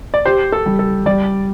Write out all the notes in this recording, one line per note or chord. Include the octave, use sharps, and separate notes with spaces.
D5
G4 C5
A4
G3
A4
G3 D5